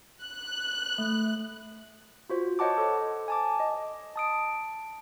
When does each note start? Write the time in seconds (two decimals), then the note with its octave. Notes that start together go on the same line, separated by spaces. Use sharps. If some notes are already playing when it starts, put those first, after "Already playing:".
0.24 F#6
0.98 A3
2.30 F4 F#4 C5
2.59 C5 C#5 D#5 F#5 A5 D6
2.78 A4 C5
3.28 G#5 A5 D6
3.60 D#5
4.16 A5 D#6 D7